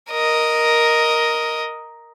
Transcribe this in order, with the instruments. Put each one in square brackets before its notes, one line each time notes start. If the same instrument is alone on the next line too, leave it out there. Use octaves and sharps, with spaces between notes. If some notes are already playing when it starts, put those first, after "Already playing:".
[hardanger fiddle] A#4 D#5